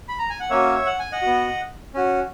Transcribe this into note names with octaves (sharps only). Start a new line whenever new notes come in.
B5
A#5
G#5
F#5
A#3 C#4 F#4 C#5 E5
F#5
G#5
D#5 F#5
B3 F#4
C#4 F#4